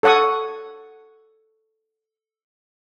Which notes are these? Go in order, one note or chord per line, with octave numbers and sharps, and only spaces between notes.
A4 C#5 F#5 C#6 D#6